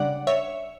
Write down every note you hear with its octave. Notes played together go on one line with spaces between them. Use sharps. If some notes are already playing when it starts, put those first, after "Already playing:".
Already playing: C#3 G3 D4 D5 F#5
C#5 E5